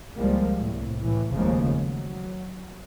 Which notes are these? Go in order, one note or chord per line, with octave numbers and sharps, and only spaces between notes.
C#2 F3 G3 G#3 A#3
C2 A2
A2 E3
F1 D#2 C#3 F3 G#3 A#3
F#3